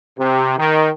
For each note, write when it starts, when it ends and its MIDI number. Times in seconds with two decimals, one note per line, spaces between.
0.18 0.55 48
0.58 0.89 51